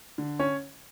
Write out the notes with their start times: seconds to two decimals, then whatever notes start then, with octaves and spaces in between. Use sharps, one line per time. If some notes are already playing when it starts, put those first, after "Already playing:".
0.18 D3
0.39 C#4 C#5